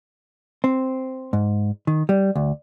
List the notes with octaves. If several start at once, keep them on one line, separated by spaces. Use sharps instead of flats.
C4
G#2
D#3
G3
D2